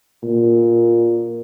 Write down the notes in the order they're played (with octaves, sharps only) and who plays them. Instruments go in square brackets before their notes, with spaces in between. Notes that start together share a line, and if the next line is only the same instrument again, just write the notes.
[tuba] A#2